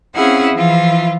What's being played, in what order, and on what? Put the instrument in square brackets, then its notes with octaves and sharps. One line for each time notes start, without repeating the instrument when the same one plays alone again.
[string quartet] C4 C#4 E4 G#4 F5 F#5
E3 F3 E4 F4